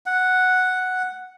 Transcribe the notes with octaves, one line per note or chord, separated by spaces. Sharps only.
F#5